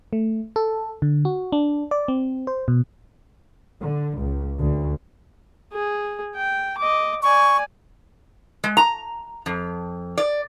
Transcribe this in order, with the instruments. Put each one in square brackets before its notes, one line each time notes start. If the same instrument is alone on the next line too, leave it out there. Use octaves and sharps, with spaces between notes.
[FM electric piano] A3
A4
D3
F#4
D4
D5
C4
C5
B2
[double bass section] D3
C#2
D2
[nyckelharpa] G#4
G5
D#5 D6
[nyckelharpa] D5 G#5 [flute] C#6
[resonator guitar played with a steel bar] G#3
A#5
F2
D5